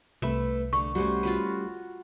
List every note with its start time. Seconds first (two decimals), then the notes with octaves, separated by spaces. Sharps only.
0.22 C2 A3 B4 E5
0.73 D3 A3 C#6
0.95 G3 A3 C#4 F#4 C5
1.23 F4 F#4 B4